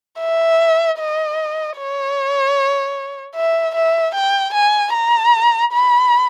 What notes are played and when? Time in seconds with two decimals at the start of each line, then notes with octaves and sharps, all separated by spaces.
0.20 E5
0.99 D#5
1.78 C#5
3.35 E5
3.75 E5
4.15 G5
4.54 G#5
4.94 A#5
5.72 B5